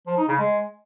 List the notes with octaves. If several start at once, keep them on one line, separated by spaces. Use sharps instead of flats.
F3
D#4
C#3
G#3